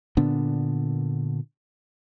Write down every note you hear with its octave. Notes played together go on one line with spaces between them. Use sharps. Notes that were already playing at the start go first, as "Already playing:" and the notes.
A#2 D3 B3 D4